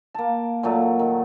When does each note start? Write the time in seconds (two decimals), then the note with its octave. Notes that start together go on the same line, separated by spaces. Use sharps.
0.14 A#3 A5
0.63 A#2 F#3 A3 E4
0.99 D#3